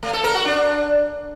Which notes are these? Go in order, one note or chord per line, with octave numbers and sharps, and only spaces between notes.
A3
A4
A#4
F#4
D4